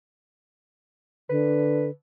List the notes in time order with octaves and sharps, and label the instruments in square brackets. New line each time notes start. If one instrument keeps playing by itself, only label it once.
[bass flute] D3 [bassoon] B4